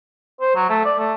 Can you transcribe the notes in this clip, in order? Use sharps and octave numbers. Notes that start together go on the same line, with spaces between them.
C5
F#3
A3
D5
A3